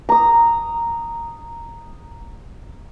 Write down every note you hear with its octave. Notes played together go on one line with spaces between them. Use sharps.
A#5 D#6